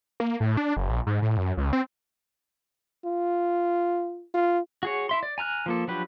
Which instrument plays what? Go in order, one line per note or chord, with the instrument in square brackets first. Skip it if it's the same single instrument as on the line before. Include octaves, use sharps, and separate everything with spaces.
[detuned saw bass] A#3
A2
D4
F#1
A#1
G#2
A2
F#2
C#2
C4
[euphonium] F4
F4
[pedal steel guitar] F#4 G#4 C#5
E4 E5 C6
D5
G#5 A#5 F6 F#6
F3 A#3 A4
F3 F#3 D4 G4 B4